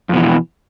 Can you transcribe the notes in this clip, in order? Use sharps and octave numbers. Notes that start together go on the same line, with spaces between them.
F2 B2 E3